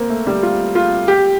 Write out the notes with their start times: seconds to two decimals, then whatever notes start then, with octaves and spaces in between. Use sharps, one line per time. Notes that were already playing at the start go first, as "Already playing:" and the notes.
Already playing: A#3 C4
0.10 A3
0.27 G3
0.43 F4
0.75 F4
1.08 G4